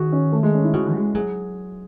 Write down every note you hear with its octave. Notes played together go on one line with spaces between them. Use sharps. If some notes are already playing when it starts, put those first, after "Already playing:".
Already playing: D#3 F#4 G#4
C#4
A3
G#3
C#4
E4
C#3 F#4
G#3
F#3 G#4